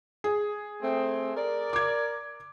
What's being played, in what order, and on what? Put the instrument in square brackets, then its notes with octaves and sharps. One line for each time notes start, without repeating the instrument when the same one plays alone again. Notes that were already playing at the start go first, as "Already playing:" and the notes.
[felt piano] G#4
[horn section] A3 C4
A#4 D5
[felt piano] D6 G#6